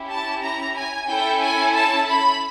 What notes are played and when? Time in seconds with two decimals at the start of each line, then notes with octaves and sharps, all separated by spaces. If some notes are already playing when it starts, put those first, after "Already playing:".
Already playing: C#4 E4 G4
0.09 A5
0.42 A#5
0.75 G#5
1.08 C#4 E4 A4 G5
1.41 G#5
1.74 A5
2.07 B5